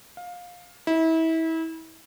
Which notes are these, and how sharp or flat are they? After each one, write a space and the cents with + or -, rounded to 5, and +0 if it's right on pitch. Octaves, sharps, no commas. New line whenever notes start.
F5 +20
E4 -30